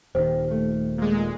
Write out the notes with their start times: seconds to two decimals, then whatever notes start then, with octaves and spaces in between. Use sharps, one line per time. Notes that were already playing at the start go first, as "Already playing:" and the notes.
0.15 D#1 D#3 G4 C5
0.50 A3
0.98 A#2 G#3